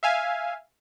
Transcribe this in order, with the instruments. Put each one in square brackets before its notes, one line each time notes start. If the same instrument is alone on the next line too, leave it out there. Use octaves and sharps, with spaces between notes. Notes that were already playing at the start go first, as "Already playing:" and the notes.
[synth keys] E5 F5 G#5